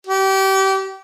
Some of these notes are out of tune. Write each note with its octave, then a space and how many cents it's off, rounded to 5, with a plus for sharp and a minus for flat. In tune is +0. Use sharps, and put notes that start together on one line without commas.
G4 -30